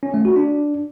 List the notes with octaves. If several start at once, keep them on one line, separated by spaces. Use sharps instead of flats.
C#4
A3
F#4
D4